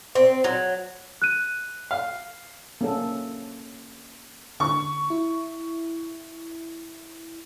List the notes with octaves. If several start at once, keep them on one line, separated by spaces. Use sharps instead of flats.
C4
F#3
F#6 D#7
F5
A#3 C#4 A4
D3 C#6
E4